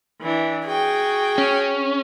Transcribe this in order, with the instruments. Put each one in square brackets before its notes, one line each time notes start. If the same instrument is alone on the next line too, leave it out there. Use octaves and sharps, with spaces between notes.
[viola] E3 D4
[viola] F#4 G5 [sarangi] G#4
[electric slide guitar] C#4